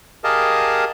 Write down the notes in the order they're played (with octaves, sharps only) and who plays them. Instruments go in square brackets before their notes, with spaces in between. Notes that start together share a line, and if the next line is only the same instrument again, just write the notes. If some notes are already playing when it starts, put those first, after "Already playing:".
[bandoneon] G4 G#4 A#4 D#5 F5 A5